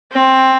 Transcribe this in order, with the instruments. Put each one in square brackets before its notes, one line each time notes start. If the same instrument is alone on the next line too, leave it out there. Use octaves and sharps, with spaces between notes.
[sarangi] C4